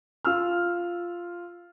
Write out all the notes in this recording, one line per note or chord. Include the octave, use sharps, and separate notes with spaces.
F4 E6 F6